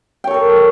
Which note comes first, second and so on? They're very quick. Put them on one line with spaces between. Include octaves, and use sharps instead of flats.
G5 C#5 A4 A#4